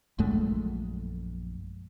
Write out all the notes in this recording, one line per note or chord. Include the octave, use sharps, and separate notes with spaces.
A#1 F#2 G#3 A3